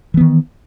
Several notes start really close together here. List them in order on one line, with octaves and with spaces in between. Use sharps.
E3 B3 D#3